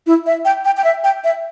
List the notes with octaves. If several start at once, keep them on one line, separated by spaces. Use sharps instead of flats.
E4
E5
G5
G5
G5
E5
G5
E5